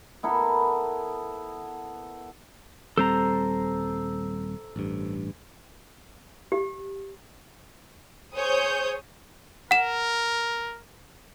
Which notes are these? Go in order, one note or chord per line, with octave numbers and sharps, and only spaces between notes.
B3 E4 A4 A#4
D#1 G3 C4 A4 C5 A#5
A1 G2
G4
G#4 C5 C#5 D#6 G6
A#4 F#5 E7